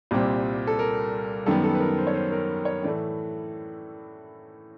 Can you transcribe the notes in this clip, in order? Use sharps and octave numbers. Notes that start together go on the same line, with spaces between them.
C2 A#2 G3 C4
A4
A#4
F#2 D#3 G3 B3 A4
A4
B4
A#4
C5
C#5
C5
A#4
C#5
A2 E3 A3 D5